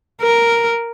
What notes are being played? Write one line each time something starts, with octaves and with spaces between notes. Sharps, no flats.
A#4